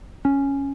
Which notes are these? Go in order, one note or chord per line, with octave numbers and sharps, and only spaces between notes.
C#4